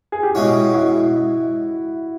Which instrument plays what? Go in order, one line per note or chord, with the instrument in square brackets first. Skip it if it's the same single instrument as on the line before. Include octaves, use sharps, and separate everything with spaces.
[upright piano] G#4
G4
[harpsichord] B2 G#3 C#4 [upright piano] E4 F#4
[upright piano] E4 F#4